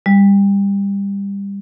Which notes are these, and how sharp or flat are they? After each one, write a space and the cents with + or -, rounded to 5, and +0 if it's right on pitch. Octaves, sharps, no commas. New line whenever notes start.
G3 +20